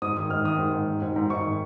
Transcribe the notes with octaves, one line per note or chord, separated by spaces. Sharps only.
G#2 D#6
D#3 D#6
G#2 F6
D#3 D#6
G#2
G#2
D#3
G#2
G#2
G#2 C#6
D#3